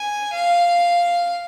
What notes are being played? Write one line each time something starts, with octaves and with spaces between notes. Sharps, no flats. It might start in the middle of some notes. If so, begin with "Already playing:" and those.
Already playing: G#5
F5